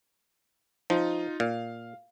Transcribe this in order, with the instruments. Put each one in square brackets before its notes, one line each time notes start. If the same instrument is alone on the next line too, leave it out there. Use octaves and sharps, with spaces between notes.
[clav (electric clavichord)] F3 [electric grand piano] D#4 F4
[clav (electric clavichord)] A#2 [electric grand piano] F5